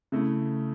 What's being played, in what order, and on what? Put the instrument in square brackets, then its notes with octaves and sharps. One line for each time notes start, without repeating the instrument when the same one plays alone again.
[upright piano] C#3 A3 E4